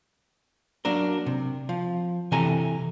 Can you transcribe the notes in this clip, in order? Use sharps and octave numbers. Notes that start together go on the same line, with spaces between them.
F#3 A#3 D4 A#4
C3
F3
C3 E3 A4 G#5 A#5